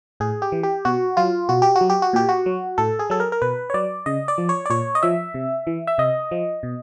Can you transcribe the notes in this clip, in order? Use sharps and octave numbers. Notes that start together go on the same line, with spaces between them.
A2 G#4
G4
E3
G4
B2 F#4
F#3 F4
B2 F#4
G4
F#4
F#3
G4
F#4
A#2 G4
F#4
F#3
A2 A4
G#4
F#3 A4
A#4
A#4
B2 B4
C#5
F#3 D5
C#3 D#5
D5
F3
C#5
D5
A#2 C#5
D#5
F3 E5
C3
E3
E5
C3 D#5
F3
B2